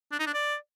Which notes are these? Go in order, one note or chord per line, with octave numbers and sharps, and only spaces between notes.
D4
D#4
D4
D5